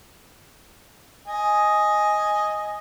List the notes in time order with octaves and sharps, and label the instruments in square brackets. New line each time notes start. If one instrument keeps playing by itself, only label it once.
[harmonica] D#5 G#5